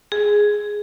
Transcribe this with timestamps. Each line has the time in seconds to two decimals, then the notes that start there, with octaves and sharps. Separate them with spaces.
0.12 G#4